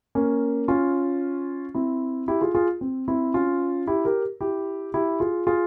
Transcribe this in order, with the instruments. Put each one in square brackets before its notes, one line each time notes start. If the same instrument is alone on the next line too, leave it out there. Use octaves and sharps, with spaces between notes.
[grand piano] A#3 C#4
C#4 F4
C4 E4
E4 G4
F4 G#4
F4 G#4
C4
C4 E4
C#4 F4
E4 G4
G4 A#4
E4 G4
E4 G4
F4 G#4
F4 G#4